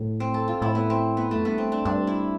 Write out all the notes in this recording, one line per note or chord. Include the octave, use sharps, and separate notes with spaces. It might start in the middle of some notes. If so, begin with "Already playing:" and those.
Already playing: A2
C4
A4
F4
A2 E4
B3
C4
B3
F2 A3
G2 B3
C4
D4
G2 D4
E4